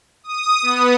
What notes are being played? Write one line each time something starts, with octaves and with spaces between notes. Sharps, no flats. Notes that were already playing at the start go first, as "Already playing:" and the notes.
D#6
B3